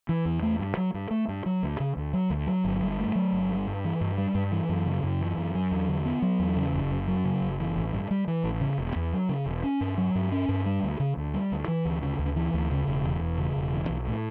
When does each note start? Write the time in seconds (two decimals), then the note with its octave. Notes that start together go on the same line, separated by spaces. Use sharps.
0.09 E3
0.25 E2
0.43 A3
0.59 G2
0.77 F#3
0.94 G2
1.11 A3
1.28 G2
1.46 F#3
1.63 D2
1.80 C#3
1.97 D2
2.13 F#3
2.30 D2
2.47 F#3
2.65 G1
2.82 G2
2.99 A3
3.15 F#3
3.33 G1
3.49 G3
3.67 G2
3.85 E3
4.01 G2
4.18 G3
4.35 G2
4.52 E3
4.69 F#2
4.86 C#3
5.03 F#2
5.21 E3
5.38 F#2
5.55 F#3
5.71 E2
5.88 D3
6.05 B3
6.22 F#3
6.39 E2
6.57 C#3
6.74 F#1
6.91 F#2
7.08 F#3
7.25 C#3
7.42 F#1
7.60 E3
7.77 A1
7.93 G2
8.11 G3
8.28 E3
8.44 A1
8.61 C#3
8.78 E1
8.96 E2
9.13 F#3
9.29 C#3
9.46 E1
9.63 C#4
9.81 G2
9.98 F#3
10.15 G2
10.32 C#4
10.49 G2
10.66 G3
10.83 D2
11.00 C#3
11.17 D2
11.34 G3
11.52 D2
11.68 E3
11.85 D2
12.02 C#3
12.19 D2
12.36 E3
12.54 D2
12.71 C#3
12.87 E1
13.04 E2
13.21 E1
13.38 C#3
13.56 E1
13.73 E3
13.89 B1
14.08 A2